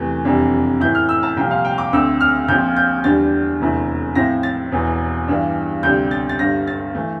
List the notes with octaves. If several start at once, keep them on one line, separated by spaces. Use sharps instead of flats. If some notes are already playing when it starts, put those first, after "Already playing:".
Already playing: E2 C3 E3 A3
F1 F2 E3 G3 D4
A2 E3 A3 E4 G6
F6
E6
A5
C2 A#2 F3 G5
F5
G5
D6
D2 D3 A3 C4 E6
F6
A#1 A#2 F3 C4 G6
G6
E2 D3 G3 D4 A6
F1 E2 D3 A3 E4
A2 F3 C4 E4 A#6
A6
E1 E2 E3
G2 E3 G3 D4
D2 C3 G3 D4 G6
A6
A6
G1 G2 D3 A#6
A6
E3 A3